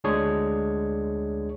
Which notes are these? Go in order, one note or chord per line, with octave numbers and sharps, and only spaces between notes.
D2 G#3 D4 G#4 C#5